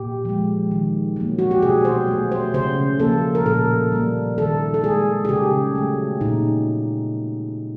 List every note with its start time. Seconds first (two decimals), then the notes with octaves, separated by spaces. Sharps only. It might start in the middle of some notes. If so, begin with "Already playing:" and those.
Already playing: A#2 G4
0.25 F3 G#3
0.71 D#3
1.16 F#3 A#3
1.39 F#4
1.51 G4
1.62 B2 G#4
1.85 C5
2.08 F#3 A3
2.32 C5
2.54 C#3 C5
2.99 F3 A#3 A4
3.35 A#4
3.45 A#2 A4
3.92 G3 A#3
4.38 D#3 A4
4.74 A4
4.83 G#3 G#4
5.25 G#4
5.29 C#3 G4
5.75 F#3 A3
6.21 A#2 D#4